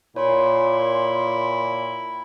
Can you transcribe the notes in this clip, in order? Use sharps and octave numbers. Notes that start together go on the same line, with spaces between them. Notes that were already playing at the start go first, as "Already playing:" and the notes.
A#2 E4 C#5 C6